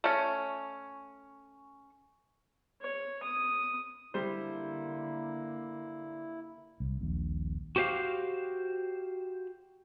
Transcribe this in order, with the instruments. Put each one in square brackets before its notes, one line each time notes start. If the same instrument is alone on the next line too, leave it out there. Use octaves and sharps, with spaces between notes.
[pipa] A3 C#4
[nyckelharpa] C#5
D#6
[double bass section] D3 A#3 [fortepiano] G3 C5 [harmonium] E4
[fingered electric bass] C2
D#1 A#1
[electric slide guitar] F#4 G4 C5 E5 F5